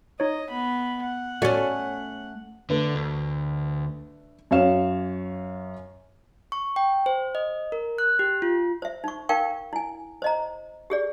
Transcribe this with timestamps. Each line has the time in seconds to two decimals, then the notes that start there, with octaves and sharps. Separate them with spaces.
0.20 D#4 C#5 D#5
0.50 B3 B5
1.03 F#5
1.42 A3 C#4 F#4 D5 C#7
2.70 D3 A3 D4 B4
2.95 D2
4.51 F#2 C#5 F5 E7
6.52 C#6
6.76 G5
7.06 C5
7.35 D#5
7.72 A#4
7.98 F#6
8.19 G4
8.42 F4
8.82 C5 E5
9.04 D#4 C#6
9.29 D#4 A#4 F5 G5 C#6
9.73 E4 G#5
10.22 C5 D#5 A#5
10.90 G4 G#4 D5